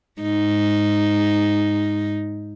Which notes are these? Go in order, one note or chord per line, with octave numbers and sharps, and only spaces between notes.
G#2 D#4